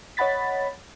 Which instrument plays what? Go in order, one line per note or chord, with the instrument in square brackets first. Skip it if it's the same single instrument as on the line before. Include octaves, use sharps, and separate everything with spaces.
[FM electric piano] C#5 D#5 F#5 B5 A6 B6